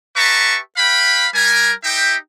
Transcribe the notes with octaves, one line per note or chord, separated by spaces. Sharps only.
G4 B4 E5 A5 A#5 C#6
B4 F5 G5 B5
G3 A#4 G#5
D#4 G4 E5 G5